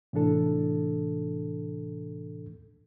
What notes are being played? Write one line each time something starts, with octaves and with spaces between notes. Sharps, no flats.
A2 C3 E3 D4 A4